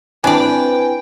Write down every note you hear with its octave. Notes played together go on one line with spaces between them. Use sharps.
C4 D4 E4 B4 D5 G5 G#5